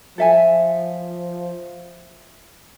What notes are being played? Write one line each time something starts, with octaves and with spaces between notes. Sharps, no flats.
F3 A4 E5 G#5